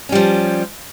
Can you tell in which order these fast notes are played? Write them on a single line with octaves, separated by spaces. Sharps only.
C#4 G3 F3